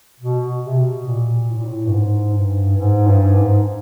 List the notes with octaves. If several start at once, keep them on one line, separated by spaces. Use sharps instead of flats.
B2
C3
B2
A#2
A2
A#2
A2
G2
G#2
G2
G#2
G2
G#2